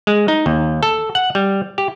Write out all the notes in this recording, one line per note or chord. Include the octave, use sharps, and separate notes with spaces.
G#3
D#4
D#2
A4
F#5
G3
G4